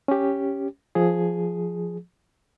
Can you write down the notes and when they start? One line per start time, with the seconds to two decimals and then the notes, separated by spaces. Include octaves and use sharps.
0.08 C#4 G4
0.95 F3 G#4